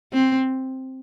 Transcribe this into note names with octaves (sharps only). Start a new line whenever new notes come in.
C4